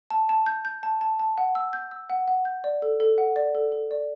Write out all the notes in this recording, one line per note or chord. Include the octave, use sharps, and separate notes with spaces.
A5
A5
G6
G6
A5
A5
A5
F#5
E6
G6
E6
F#5
F#5
G6
D5
A4
A4
F#5
D5
A4
A4
D5